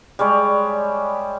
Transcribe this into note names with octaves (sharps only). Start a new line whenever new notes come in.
G3 G#3 C#5 D5